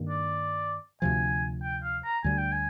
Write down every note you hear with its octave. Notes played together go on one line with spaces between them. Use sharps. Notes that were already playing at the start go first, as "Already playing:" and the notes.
Already playing: G2 D#3 A#3
D5
D2 C3 F3 G#5
G5
F5
A#5
D2 D3 G3 G#5
G5
G#5